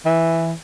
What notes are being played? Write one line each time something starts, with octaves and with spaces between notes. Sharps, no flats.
E3